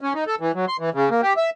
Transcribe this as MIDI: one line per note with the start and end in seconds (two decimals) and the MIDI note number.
0.01 0.13 61
0.14 0.24 63
0.27 0.35 69
0.40 0.52 52
0.55 0.65 54
0.68 0.77 84
0.79 0.90 52
0.94 1.09 49
1.11 1.21 58
1.22 1.33 67
1.37 1.50 76